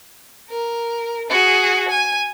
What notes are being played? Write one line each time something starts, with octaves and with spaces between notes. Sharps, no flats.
A#4
F#4 G#4
G#5